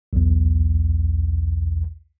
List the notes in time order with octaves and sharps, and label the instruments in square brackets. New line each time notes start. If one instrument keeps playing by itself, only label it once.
[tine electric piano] B1 E2